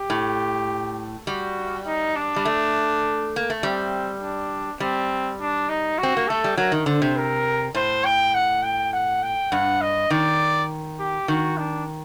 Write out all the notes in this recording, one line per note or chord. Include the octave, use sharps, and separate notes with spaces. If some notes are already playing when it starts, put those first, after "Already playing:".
Already playing: G4
A2
G3 F#4
D#4
D4
G3
A3
A#3
A3
G3 C4
D4
G3 C4
D4
D#4
F#4
C4
A#3
A3 A4
G3
F#3 A#4
D#3
D3 C5
C3
A#4
A2 C5
G5
F#5
G5
F#5
G5
G2 F#5
D#5
D#3 D5
G4
D#3 F#4
D4